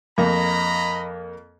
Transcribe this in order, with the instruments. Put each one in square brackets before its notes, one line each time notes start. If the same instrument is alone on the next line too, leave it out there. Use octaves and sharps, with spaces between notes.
[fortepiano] F2 A#3 [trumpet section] D#5 A#5 B5